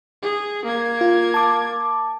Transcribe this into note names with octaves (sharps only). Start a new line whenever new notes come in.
G#4
A#3 G#6
F4
A5 D6